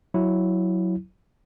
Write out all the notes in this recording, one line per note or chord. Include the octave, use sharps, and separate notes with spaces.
F#3 E4